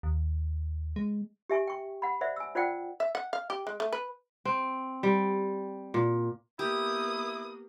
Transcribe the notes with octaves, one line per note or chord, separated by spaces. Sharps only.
D#2
G#3
G4 E5 G#5 C#6
G5 C#6
F#5 B5
C5 D5 E5 F#5
G#5 E6
F4 C5 D5 F#5 G5
E5
F#5
F5
G4
G#3
A3
B4
C4
G3
A#2
A#3 B3 E4 G4 D#6